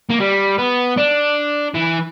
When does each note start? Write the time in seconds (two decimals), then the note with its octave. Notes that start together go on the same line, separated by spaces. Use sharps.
0.09 A#3
0.20 G3
0.58 B3
0.97 D4
1.75 E3